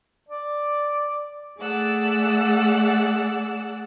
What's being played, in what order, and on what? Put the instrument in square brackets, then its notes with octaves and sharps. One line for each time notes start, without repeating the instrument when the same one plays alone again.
[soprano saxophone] D5
[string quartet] A3 G#4 D5 F#5 E6